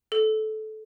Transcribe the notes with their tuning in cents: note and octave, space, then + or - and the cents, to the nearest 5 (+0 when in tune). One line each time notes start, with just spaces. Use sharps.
A4 -20